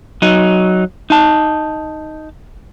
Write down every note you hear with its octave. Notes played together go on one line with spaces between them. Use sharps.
F#3 D#4
D#4 A5